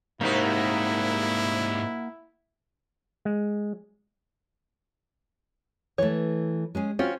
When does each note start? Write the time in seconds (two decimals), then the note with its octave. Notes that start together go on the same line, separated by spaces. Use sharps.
0.21 G#2 C3 G3 A#3 D#4 E4 F#4 A#4
3.25 G#3
5.98 E3 A3 C#5
6.75 G#3 C#4 G#4
6.99 C4 C#4 F4 F#4